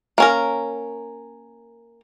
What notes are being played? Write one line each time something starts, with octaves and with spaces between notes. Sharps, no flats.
A#3 C#4 A#4